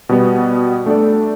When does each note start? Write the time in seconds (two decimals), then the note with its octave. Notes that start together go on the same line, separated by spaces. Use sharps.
0.09 B2 G3 B3
0.86 A3 D4 A4 D5